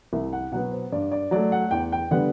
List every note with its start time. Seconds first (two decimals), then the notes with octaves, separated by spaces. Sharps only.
0.13 C2 E5
0.33 F#5
0.52 B2 F#3 B3 F#5
0.72 C5
0.92 G2 D5
1.12 D5
1.31 F#3 A3 D5
1.52 F#5
1.71 E2 G5
1.92 G5
2.11 D3 G3 B3 F#5